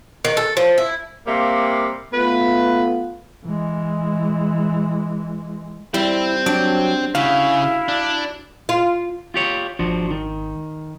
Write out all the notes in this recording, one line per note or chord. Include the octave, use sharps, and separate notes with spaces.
D#3
A4
F3
E4
C3 G3 A#3
A3 B3 F4 B4
E3 G#3
G3 C4 E4
F#3 D4 G5
C#3 E4 F#4 F5
D4
F4
F4 G4 C#5
G#1 F3 D4 F#4
D#3